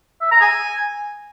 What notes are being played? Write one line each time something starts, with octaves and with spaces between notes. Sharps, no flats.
E5
A#5
G#5